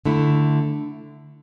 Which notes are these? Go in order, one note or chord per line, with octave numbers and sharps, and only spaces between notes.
D3 A3 E4